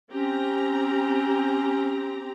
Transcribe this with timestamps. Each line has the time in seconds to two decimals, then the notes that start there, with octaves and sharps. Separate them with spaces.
0.10 C4 C#4 G4 A#5